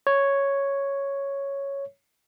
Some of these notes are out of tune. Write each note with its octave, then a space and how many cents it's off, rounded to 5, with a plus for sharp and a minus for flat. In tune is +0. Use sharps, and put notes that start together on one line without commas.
C#5 +0